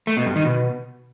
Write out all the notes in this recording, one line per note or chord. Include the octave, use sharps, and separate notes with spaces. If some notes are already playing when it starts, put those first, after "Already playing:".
A3
B2
G2
D#3
B2